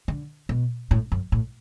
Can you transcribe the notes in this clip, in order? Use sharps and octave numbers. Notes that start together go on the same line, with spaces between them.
D3
B2
A2
F#2
A2